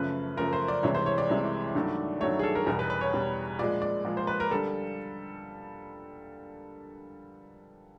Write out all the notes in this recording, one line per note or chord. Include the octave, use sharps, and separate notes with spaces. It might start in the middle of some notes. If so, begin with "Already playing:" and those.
Already playing: F#2 C#3 F3 A3 B4
F#2 C#3 F3 A3 A#4
C5
D5
C2 C3 E3 G#3 C#5
C5
C#5
D5
C2 C3 E3 G#3
G2 D#3 F#3 A3
G2 D#3 F#3 A3 C#5
G#4
A4
A#4
E2 B2 G3 A#4
B4
B4
C#5
E2 B2 G3
A#2 F3 G#3 D5
D5
A#2 F3 G#3
C5
B4
A#4
D3 G3 A4